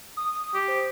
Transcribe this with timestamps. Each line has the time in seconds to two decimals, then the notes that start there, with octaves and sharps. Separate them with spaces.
0.17 D#6
0.54 G4
0.68 C5